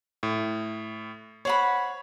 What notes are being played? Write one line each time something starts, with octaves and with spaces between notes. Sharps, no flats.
A2
C5 C#5 F#5 B5